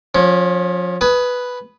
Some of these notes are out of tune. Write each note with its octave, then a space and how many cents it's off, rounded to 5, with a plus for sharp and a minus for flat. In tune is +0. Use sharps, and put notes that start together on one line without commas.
F3 +30 C#4 +0
B4 +0 G#5 +35 D#6 +0